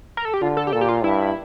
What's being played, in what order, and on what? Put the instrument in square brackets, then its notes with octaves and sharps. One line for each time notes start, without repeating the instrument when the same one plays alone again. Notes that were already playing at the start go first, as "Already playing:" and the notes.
[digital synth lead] A#4
A4
G4
[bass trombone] D3 [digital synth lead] F4
[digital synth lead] A4
G4
[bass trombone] A#2 [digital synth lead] A4
[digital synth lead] G4
F4
[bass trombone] G2 [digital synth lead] E4